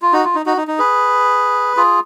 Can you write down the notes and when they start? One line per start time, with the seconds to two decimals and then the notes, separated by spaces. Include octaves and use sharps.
0.02 F4
0.13 D#4 F#4
0.24 F4
0.35 D#4
0.46 D#4 F#4
0.57 D#4
0.68 D#4
0.78 G#4 B4
1.77 F4 G#4